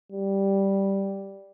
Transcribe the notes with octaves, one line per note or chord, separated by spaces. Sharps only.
G3